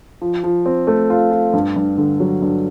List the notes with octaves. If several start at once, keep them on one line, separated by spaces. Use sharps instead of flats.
F3
F3
C4
A3
F4
F4
G2
G2
D3
F#3
G2